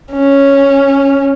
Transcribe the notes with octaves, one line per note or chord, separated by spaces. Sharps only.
C#4